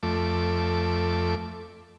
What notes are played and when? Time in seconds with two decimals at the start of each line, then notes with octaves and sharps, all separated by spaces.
0.03 F2 A3 D6